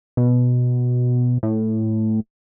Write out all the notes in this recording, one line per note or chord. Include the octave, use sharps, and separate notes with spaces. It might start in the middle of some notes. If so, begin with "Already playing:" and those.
B2
A2